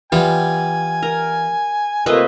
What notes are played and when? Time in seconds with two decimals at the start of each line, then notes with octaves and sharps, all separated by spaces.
0.12 E3 G3 B3 F4 G#5
1.03 A#4
2.06 C3 A3 A#3 F4 B4 D#5 E5